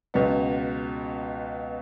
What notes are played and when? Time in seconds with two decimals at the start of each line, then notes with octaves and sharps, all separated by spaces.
0.14 C#2 B2 B3